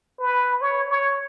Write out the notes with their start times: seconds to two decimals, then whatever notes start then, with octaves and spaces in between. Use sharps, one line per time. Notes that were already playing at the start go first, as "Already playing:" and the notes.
0.18 B4
0.61 C#5
0.88 C#5